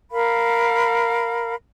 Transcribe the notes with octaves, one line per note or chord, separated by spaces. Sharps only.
A#4 F5 B5